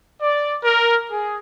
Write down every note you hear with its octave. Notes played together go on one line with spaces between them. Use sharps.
D5
A#4
G#4